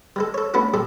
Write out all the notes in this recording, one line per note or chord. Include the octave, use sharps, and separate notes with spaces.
G3 G#3 A4
A4 C#5
A3 B3 C#4 D4 E4 F#4
A#2 G3 G#4 A4